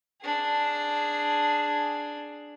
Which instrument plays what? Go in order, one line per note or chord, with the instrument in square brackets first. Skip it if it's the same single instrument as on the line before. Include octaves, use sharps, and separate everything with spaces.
[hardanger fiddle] D4 G#4